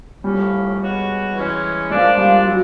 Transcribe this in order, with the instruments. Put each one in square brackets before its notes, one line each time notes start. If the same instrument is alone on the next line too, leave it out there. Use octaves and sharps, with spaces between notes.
[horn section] A2 F3 A#3 C#4 [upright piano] G3
[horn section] B2 G#3 C#4 F#4
E3 G#3 C#4
[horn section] F3 A#3 D4 [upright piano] G#3
[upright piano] G3
F#3